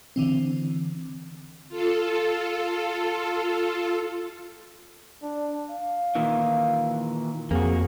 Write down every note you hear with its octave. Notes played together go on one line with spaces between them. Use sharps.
D3 E3 C4
F4 A4
D4
F5
A#2 D#3 E3
F2 A#3 F#4 G#4